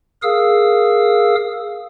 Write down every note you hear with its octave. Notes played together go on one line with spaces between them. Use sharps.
G#4 A#4 F5 D#6 E6